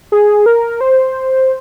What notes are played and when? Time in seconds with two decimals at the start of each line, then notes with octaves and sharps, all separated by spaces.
0.12 G#4
0.46 A#4
0.81 C5